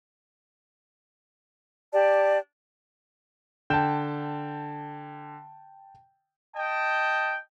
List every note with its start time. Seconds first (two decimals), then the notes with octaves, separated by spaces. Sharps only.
1.93 G4 D5 A5
3.70 D3 G5 A5 G6 E7
6.55 D#5 G5 A5